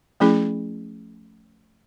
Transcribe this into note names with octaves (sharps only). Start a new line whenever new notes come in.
F3 A3 C#4 E4 G#4